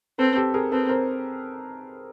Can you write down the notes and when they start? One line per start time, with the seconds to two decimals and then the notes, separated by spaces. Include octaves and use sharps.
0.18 C4 A4 B4
0.36 G4 A4
0.54 G#4 A#4
0.72 C4 A4 B4
0.89 A#4 C5